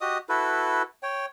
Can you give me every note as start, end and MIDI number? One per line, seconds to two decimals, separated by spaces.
0.01 0.18 66
0.01 0.18 67
0.01 0.18 75
0.01 0.18 87
0.29 0.82 64
0.29 0.82 66
0.29 0.82 69
0.29 0.82 71
1.03 1.26 73
1.03 1.26 79